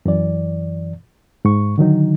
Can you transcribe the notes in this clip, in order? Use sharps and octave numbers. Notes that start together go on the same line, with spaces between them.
F#2 E3 D5
G#2 C#6
D3 D#3 F#3 D#4